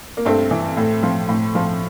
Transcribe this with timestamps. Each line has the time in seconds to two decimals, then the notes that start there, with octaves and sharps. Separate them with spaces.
0.17 A#3
0.25 G2 A3 C4
0.51 E3
0.77 A2
1.03 F3
1.29 A2
1.55 F3